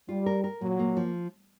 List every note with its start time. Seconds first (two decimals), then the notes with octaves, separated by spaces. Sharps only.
0.08 G3 F4
0.26 A#4
0.44 A#4
0.61 A#2 F#3
0.79 A#3
0.97 F3